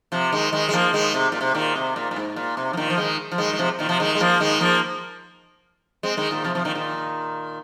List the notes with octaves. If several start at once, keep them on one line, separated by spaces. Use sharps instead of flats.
C3 F3
D#3 G#3
D#3 G#3
G#3
F3 A#3
D#3 G#3
C3
A#2
C3
A#2 D#3
C3
A#2
A#2
G#2
A#2
C3
F3
A#2 D#3
F3
D#3 G#3
F3
D#3 G#3
G#3
C3 F3
A#2 D#3
C3 F3
D#3 G#3
G#3
F3 A#3
D#3 G#3
F3 A#3
G#3 C4
D#3 G#3
A#2 D#3
C3 F3
C3 F3
A#2 D#3
A#2 D#3